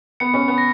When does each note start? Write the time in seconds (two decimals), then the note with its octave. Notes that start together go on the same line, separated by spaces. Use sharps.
0.20 B3 C#7
0.34 C#4
0.48 B3
0.58 A#6